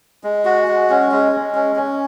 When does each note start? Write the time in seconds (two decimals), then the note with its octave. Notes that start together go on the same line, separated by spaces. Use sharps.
0.24 G#3
0.45 F#4
0.67 G#3
0.90 C#4
1.11 G#3
1.32 G#3
1.54 C#4
1.76 C#4